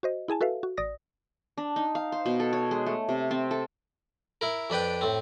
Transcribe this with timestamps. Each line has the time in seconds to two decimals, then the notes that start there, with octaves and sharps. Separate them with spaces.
0.03 F#4 C5 D#5
0.28 E4 G#4 G#5 A5
0.41 F#4 A4 B4 E5 F5
0.63 F#4
0.77 A1 D5 D#6 A#6
1.58 D4
1.76 D#4
1.95 F5
2.12 C5
2.26 B2
2.40 A4
2.53 C#5
2.71 G#3
2.86 A3
3.09 C3
3.31 C4
3.51 A4
4.41 E4 A#4
4.70 F2 D4 B4 G5 D6
5.01 A2 C4